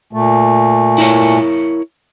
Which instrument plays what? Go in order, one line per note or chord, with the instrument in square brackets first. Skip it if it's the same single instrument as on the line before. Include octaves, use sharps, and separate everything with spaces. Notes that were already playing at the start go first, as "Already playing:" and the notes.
[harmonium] A#2 A3
[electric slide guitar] E4 A#4 C#5